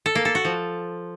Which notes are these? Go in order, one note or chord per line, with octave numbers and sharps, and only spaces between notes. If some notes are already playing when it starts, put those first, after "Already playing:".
A4
A#3
A4
F#4
F3